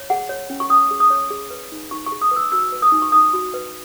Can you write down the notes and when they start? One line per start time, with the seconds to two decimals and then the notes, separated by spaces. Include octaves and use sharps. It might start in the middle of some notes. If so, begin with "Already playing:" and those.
Already playing: C#5
0.10 G#4 F#5
0.29 C#5
0.50 C#4
0.60 C#6
0.70 C#4 D#6
0.91 G#4
1.00 D#6
1.10 C#5
1.31 G#4
1.50 B4
1.72 D#4
1.91 D#4 C#6
2.06 C#6
2.12 G#4
2.22 D#6
2.31 B4
2.36 E6
2.52 F#4 E6
2.72 B4
2.82 D#6
2.92 D#4
3.02 C#6
3.12 D#4 D#6
3.34 F#4
3.54 B4